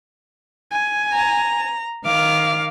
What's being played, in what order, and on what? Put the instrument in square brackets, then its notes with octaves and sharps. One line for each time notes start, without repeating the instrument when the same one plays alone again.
[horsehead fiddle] G#5
[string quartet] A#5
[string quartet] D#3 D6 F6 [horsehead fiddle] F5